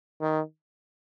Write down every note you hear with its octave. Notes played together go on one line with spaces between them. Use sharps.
D#3